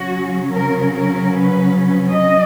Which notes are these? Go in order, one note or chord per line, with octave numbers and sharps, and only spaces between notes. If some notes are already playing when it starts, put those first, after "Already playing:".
Already playing: C#3 F#3 C#4 F#4
A#4
A#4
B4
D#5